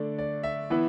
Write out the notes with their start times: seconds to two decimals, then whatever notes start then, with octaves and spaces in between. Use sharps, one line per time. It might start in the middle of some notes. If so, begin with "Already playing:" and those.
Already playing: D3 A3 D4 D5
0.18 D5
0.43 E5
0.70 E3 B3 E4